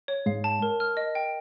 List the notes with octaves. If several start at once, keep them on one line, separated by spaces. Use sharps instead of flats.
C#5
G#2 G#3 F5
A5
A#4
F6
D#5
G5